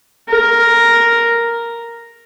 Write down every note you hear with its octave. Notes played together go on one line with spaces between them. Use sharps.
A#4